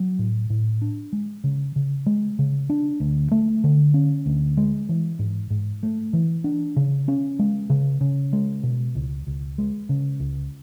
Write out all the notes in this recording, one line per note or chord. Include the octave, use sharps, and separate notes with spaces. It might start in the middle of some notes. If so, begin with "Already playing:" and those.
Already playing: F#3
A2
A2
D4
G#3
C#3
C#3
G#3
C#3
D4
D2
A3
D3
C#4
D2
G#3
E3
G#2
G#2
A3
E3
D4
C#3
C#4
G#3
C#3
C#3
G#3
B2
C#2
C#2
G#3
C#3
C#2